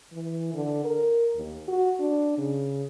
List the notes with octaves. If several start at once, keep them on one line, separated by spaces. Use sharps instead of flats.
E3
D3
A#4
D#2
F#4
D4
C#3